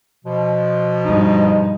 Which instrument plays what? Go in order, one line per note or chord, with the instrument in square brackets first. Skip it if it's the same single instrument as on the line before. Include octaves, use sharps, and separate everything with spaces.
[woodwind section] B2 F3
[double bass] G2 D#4